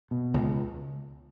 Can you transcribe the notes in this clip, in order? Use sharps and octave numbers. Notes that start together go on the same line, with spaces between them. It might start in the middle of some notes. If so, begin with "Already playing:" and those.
B2
C#2